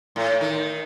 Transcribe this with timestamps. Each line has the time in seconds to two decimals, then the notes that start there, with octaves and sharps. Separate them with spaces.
0.16 A2
0.41 D#3